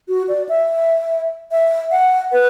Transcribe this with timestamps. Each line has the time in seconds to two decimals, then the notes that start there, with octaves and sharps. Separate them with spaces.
0.09 F#4
0.28 D5
0.49 E5
1.51 E5
1.91 F#5
2.32 B4